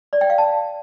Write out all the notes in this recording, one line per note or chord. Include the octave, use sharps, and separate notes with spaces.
D5
G5
F5
A5